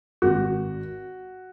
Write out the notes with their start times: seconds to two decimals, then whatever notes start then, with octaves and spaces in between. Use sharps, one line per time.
0.22 G#1 F#4